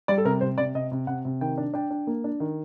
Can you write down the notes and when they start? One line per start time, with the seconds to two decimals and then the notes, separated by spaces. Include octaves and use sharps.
0.08 G3 D5
0.18 A4
0.25 C3 A#4
0.41 C3 C5
0.58 C3 D5
0.75 C3 D#5
0.91 C3
1.07 C3 F#5
1.25 C3
1.41 D#3 G5
1.58 D4
1.74 D4 G5
1.91 D4
2.07 A#3
2.24 D4
2.40 D#3